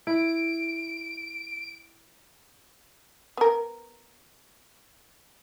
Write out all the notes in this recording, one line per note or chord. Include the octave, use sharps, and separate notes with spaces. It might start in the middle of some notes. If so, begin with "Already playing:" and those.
E4 D7
B3 A#4